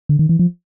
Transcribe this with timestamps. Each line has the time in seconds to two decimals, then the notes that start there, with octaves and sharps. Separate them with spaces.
0.09 D3
0.19 D#3
0.29 E3
0.39 F3